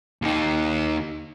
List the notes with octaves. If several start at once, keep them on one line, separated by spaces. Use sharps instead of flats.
D#2 D#4